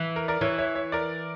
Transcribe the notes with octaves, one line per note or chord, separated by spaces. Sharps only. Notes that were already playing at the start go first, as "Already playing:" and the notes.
Already playing: E3
A#4
A#4 D5
E3 C#5 E5
C#5 E5
C#5 E5
A#4 D5